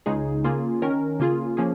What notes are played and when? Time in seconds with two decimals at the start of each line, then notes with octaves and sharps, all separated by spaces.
0.06 C#2 C#3 G#3 D#4 G#4
0.44 C#3 A#3 F4 G#4
0.82 D#3 C#4 A#4
1.20 C#3 A#3 F4 G#4
1.57 F3 A#3 C#4 G#4